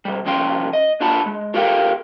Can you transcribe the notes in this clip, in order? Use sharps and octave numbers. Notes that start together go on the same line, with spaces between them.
B2 G3
C2 F3 C#4 G5 C6
D#5
F#2 D4 F4 F#5 A5 B5
G#3
F4 G4 A4 A#4 F5 G5